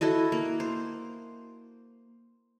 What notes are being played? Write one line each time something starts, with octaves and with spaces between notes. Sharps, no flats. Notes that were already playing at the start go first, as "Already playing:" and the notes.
E4 F#4 A4 D#5
A#3
C5